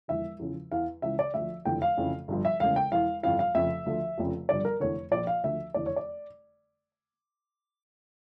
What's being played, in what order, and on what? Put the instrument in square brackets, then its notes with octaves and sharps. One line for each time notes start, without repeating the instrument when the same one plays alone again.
[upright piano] E1 E2 D3 F3 E5
E2 C#3 F3
E2 E3 F5
C#2 C#3 E3 E5
D5
D2 D3 F3 E5
F1 E2 D3 F3 G5
F5
F1 F2 C#3 E3
G1 G2 D3 F3
E5
E1 D2 C#3 F5
G5
E1 E2 E3 F5
G1 F2 E3 F5
F5
F1 F2 C#3 F3 E5
D2 D3 F3
F1 F2 C#3 F3
G1 G2 D3 F3 D5
A#4
F1 E2 D3 C#5
A#1 A#2 F3 D5
F5
D2 D3 F3 E5
F1 E2 D3 D5
C#5
D5